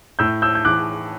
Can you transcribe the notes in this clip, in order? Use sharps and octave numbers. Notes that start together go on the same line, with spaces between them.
A2 E6 G6
E6 G6
G6
E3 D6 F#6